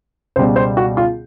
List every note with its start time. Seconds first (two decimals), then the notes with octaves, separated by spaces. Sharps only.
0.36 C#2 B2 G3 C5
0.56 C5
0.77 F#4
0.97 F4